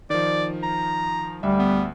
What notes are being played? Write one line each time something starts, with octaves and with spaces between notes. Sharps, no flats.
D#3 F3 D5
A#5
D2 G3 E5
B3